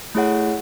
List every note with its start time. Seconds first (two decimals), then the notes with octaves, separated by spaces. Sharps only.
0.15 A3 E4 G#4 C#5 F#5